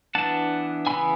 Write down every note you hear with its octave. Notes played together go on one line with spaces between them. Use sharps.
E3 B3 D4 F#5 A5
C#3 E3 B3 G#5 B5